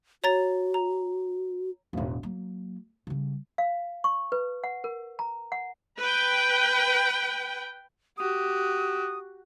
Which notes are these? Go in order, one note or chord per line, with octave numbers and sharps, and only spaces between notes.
F#4 C#5 A#5 A6
A#5
E1 A1
F#3 A#3
C#3 G3
F5
C#6
B4
F#5
A#4
A#5
F#5
B4 G5
F#4 G4 D#6